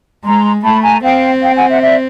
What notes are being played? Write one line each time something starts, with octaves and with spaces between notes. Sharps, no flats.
G#3 A#5 C6
A3 A5 B5
G#5 A#5
C4 F5 G5
F5 G5
F#5 G#5
E5 F#5
D5 E5